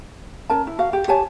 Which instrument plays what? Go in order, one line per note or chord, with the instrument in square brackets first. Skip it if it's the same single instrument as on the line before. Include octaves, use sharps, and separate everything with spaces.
[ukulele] C#4 A#4 A5
E4
F#4 F5
G4
G4 C#5 G#5 A5